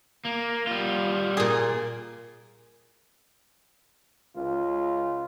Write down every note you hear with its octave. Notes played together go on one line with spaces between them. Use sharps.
A#3
G3 F4
A#2 G#4
C#2 F4